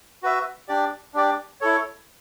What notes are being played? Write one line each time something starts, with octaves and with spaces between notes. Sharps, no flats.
F#4 B4 E5
D4 G4 D5
D4 G4 D5
E4 A4 C#5